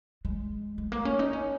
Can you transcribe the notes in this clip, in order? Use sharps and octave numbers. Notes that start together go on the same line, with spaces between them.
G#3
G#3
A#3
C#4
D#4
C#4